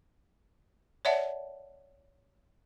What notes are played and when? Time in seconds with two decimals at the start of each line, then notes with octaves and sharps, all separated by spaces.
1.05 C#5 D5 E5 F#5 A5